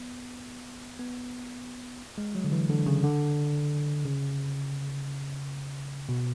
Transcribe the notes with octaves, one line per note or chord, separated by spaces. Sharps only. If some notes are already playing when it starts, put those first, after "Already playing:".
Already playing: B3
B3
G#3
F#3
D3
E3
D3
C#3
D3
C#3
B2